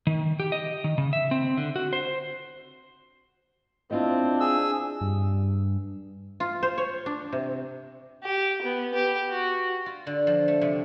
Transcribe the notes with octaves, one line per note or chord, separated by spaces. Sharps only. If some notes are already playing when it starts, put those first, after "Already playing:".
D#3
G4
D#5
D#3
C#3
E5
C4
D3
F#4
C5
C4 D4 E4 F4 D#5
G#4 E6
G2
F4
C5
C#5
D4
C3
G4
B3
G4
F#4
F4
D3
F3
A3
C3